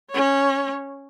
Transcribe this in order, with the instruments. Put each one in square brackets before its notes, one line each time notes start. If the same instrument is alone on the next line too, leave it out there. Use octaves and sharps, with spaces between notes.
[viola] C#4 C#5